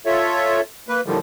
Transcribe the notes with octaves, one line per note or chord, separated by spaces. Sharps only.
F4 A4 C#5 E5
A#3 B4
A2 D3 D#3 F3 G3